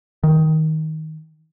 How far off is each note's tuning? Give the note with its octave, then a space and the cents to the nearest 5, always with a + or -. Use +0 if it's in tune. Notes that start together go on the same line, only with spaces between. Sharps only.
D#3 +15